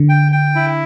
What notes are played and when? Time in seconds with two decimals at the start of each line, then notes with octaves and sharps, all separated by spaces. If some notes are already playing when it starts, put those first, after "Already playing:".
Already playing: D3
0.09 G5
0.32 G5
0.55 E4